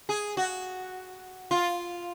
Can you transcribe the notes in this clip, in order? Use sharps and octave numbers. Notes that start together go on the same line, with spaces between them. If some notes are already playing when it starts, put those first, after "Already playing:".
G#4
F#4
F4